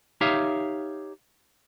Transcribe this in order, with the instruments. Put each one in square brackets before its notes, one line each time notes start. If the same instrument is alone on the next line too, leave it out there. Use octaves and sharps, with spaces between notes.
[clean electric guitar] D#4 G4 C#5 E5 F5